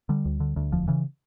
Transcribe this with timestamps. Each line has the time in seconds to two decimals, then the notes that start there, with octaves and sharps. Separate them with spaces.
0.09 D3 G3
0.25 D2
0.40 D3
0.56 D2
0.72 E1 F3
0.88 C#3 E3